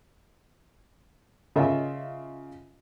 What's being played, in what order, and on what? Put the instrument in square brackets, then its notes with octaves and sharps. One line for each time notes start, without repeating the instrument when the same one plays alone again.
[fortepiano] C#3 F4 D#5 E5